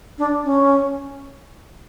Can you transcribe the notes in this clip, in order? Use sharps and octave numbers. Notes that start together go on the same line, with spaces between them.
D4
C#4